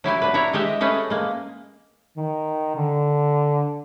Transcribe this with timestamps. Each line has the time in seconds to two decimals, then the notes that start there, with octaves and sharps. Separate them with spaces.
0.04 F#3 E4 G4 G#5
0.22 D4 B4
0.34 E4 C#5 E5 A#5
0.53 G#3 G4 D#5 E5
0.80 A3 C#4 G#4 B4 D#5
1.10 G#3 A#3
2.17 D#3
2.76 D3